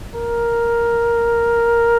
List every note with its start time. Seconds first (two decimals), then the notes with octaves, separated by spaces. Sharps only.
0.15 A#4